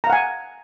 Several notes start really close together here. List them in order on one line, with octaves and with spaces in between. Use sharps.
A#5 F5 F#5 G#5